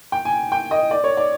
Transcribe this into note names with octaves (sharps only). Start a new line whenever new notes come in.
G5
G#5
G5
D#5
D5
C#5
D5